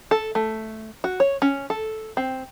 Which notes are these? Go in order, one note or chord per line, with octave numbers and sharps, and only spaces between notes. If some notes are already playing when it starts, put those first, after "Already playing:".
A4
A3
F#4
C#5
C#4
A4
C4